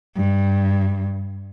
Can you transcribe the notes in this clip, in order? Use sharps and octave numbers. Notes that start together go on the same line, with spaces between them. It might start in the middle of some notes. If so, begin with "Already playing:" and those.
G2